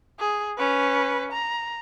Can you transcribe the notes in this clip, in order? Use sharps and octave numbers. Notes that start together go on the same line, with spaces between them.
G#4
C#4 B4
A#5